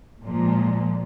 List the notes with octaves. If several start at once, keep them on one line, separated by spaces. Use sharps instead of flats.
A#2 F3 G#3